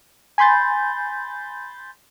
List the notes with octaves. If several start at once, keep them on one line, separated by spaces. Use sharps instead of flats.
G#5 B5 C6 G6 A6